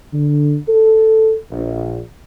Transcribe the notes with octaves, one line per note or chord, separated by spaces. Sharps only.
D3
A4
A#1